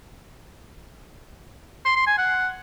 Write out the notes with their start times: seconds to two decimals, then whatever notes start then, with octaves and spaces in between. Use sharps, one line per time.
1.85 C6
1.96 C6
2.07 G#5
2.18 F#5